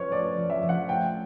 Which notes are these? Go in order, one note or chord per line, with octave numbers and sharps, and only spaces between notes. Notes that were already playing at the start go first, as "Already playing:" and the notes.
Already playing: F3 C#4 B4 C#5
A3 D5
F3
E5
F3
F#5
A3 G5